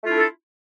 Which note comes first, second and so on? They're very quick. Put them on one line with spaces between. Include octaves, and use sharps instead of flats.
A3 F4 E4 D4 A4